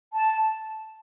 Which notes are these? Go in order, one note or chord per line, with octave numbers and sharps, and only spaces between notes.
A5